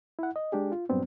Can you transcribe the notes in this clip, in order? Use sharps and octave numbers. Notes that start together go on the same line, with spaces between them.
E4 F#5
D#5
G#3 D4 G4 G#4
F4
G2 A#2 F#3 B3 C4 D4